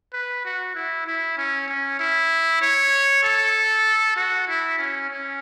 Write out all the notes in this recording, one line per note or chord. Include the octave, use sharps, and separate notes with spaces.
B4
F#4
E4
E4
C#4
C#4
E4
C#5
A4
F#4
E4
C#4
C#4